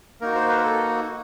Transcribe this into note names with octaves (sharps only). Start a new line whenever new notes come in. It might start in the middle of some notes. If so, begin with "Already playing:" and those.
A#3 D#4 F#4 A#4
C5
B4
A#4
A4